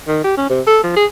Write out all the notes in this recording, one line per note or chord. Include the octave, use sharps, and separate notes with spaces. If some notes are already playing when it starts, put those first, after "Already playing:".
D#3
G4
C#4
C3
A4
F3
G#4